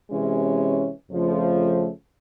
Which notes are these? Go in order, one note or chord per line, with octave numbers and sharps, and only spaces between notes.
C3 E3 G#3 C#4
F2 C#3 F3 A3